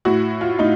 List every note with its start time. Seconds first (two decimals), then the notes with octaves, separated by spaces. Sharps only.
0.05 A2 F#4
0.41 F4
0.59 A2 D#4